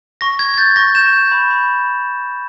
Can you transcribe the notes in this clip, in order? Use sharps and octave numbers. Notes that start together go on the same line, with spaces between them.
C#6 A#6
C#6 G#6
G#6
G6 A6
C#6 A#6
G6 E7
G6
B5
B5